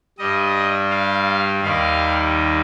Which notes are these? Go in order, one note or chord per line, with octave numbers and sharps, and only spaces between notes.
G2 G3 D#5
F5
D#2 D#3 G3 F5